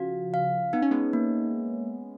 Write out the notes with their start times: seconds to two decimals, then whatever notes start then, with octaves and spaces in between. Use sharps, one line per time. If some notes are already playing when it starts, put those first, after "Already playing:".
Already playing: C#3 F3 F#4 F5
0.34 F5
0.73 B3 D#4
0.82 C#4
0.91 G#3 B3
1.13 A#3